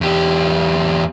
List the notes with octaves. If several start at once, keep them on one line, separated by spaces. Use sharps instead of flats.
E2 G4